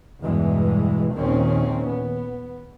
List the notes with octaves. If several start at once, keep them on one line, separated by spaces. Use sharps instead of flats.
E2 G2 B2 E3 G#3
A#1 D#2 A#2 D#3 C4 C#4
B3